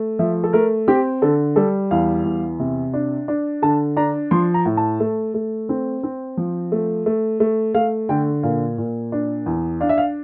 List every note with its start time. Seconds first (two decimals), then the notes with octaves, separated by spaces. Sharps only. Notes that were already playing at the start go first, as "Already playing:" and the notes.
Already playing: A3
0.19 F3 E5
0.44 A4
0.53 A3 A#4
0.88 C4 G4
1.22 D3 A4
1.56 G3 A4
1.91 E2 F5
2.25 E2
2.60 C3
2.94 D4
3.28 D4
3.62 D3 A5
3.96 D4 A#5
4.31 F3 C6
4.54 A#5
4.65 A2
4.77 A5
5.00 A3
5.34 A3
5.69 C4
6.03 C4
6.37 F3
6.72 A3
7.06 A3
7.40 A3
7.74 A3 F5
8.09 D3 G5
8.43 A#2 F5
8.78 A#2
9.12 D4
9.46 E2
9.81 D4 F5
9.89 E5
9.98 F5